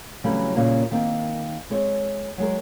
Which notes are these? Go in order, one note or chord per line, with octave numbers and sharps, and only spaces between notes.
C#3 E3 F#3 G3 A3 C4
A#2 C#3 G3 A#3
D#3 A#3 C4
G#3 C4 C#5
F#3 G#3 A#4